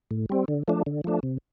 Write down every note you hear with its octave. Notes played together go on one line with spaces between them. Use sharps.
A2
G3 C4
D3
F3 A3 D4
D3
F3 A3 D4
C3